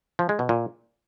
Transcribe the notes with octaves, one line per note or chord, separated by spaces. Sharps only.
F3
G#3
B2
A#2